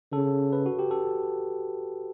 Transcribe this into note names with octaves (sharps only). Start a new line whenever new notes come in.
C#3 A4
B4
F#4
G4
A4